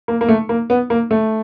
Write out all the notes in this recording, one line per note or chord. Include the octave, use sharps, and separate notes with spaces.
A#3
A#3
A3
A#3
B3
A#3
A3